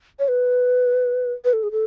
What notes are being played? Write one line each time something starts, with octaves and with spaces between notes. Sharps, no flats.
C#5
B4
B4
A4
G#4
A4